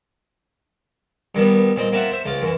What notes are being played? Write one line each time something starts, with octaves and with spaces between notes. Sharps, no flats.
G2 D#3 G3 B3
A#2 C4 D#5
A#3 C4 F4 E5 F#5
C5 E5
C#2 F4 D6
F#2 E3